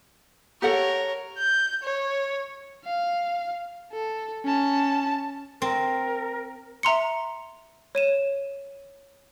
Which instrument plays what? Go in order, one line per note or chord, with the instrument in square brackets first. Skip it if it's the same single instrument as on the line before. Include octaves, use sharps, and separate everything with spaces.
[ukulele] G4 A4 F#5 [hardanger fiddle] A#4 C#5
[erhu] G6
C#5
[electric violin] F5
A4
C#4 A5
[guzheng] C4 [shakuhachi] A#4
[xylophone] E5 A#5 C6 C#7
C#5 D#7 E7